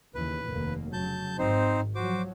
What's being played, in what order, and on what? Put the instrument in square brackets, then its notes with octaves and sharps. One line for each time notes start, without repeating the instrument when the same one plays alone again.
[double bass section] D#2 C#3 E3 [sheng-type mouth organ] B4
[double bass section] F1 D#2 A#3
[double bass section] C#3 F#3 [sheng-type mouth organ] A5 G6
[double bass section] G#1 G#2 [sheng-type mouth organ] C4 D#4 C5
[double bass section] F3 F#3 [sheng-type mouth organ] F#4 C5 D6